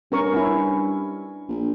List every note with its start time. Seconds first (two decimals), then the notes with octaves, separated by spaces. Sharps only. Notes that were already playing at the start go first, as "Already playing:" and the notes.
0.12 G2 C#4 A#4 C#6
0.34 C#4 E4
1.49 A#1